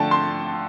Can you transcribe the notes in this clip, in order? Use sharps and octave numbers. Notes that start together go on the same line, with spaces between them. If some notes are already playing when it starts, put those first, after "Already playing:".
Already playing: D3 F3 A3 G5 A5
C6